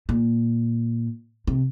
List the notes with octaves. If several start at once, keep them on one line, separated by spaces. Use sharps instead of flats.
A#2
C3